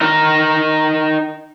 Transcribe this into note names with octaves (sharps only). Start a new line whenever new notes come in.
D#4 A#4